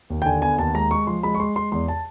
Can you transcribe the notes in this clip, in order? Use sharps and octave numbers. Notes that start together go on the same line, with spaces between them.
D#2
G5
D3 G#5
B3 G#5
D#2 A5
G#3 A#5
G#3 C#6
F3 C6
G#3 B5
C#6
G#3 C6
G#3 C6
E2 C6
A5